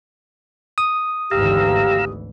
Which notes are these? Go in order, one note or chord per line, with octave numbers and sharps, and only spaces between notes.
D#6
G#1 D2 E3 G4 F5 A#5 E6